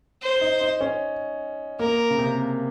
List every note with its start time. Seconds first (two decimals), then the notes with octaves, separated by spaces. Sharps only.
0.22 C5
0.41 D#4
0.61 D#4
0.81 C#4
1.79 A#3 A#4
2.11 C#3
2.19 C3